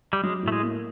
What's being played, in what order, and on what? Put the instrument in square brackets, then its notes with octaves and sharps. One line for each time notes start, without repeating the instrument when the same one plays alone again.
[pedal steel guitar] G3
[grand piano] F#3 [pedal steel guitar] G#3
[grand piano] A2 [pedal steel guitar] A3
[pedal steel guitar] G#3
[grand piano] A#3